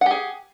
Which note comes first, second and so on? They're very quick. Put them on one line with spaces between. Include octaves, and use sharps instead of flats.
F#5 G4 G#4